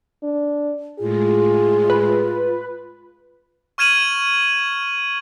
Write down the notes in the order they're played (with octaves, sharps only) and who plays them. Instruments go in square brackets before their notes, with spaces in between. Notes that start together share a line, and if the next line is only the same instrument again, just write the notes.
[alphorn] D4
[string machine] A2 G#3 [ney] F4 [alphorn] G#4
[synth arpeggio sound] B4
[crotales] C#6 F6 G#6 D#7 E7 F#7